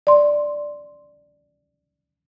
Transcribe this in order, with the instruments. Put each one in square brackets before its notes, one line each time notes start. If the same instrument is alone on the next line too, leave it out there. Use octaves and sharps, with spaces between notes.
[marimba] D5 C6